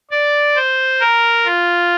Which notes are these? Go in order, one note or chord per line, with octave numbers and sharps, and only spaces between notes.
D5
C5
A#4
F4